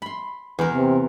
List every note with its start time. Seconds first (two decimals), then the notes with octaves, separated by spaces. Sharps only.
0.02 B5 C6
0.59 E2 A#4
0.71 C3